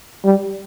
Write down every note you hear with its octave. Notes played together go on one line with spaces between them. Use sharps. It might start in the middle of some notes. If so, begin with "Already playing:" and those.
G3